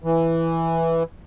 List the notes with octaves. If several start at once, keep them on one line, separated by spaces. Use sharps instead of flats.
E3